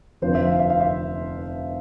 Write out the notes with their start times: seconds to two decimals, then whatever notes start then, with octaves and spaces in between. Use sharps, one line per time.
0.22 F1 F2 D3 F3 C5
0.35 E5
0.47 F5
0.59 E5
0.70 F5
0.80 E5